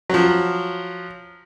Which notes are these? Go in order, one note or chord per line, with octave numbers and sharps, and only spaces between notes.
F3 F#3